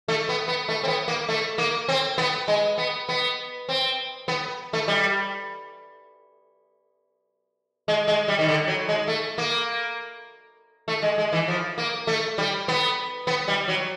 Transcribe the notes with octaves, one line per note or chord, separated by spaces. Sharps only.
A3
B3
B3
A3
C4
B3
A#3
A3
A#3
C4
B3
G#3
B3
B3
C4
B3
A3
G3
G#3
G#3
G3
D#3
D3
F#3
G#3
A3
A#3
A3
G#3
G#3
E3
F3
A#3
A3
G3
B3
B3
G3
F#3